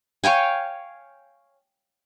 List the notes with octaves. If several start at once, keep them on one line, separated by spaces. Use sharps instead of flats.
C#5 F5 G5 G#5